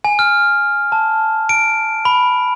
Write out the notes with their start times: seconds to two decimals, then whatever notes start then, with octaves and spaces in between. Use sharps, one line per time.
0.04 G#5
0.19 F6
0.92 A5
1.49 D7
2.05 B5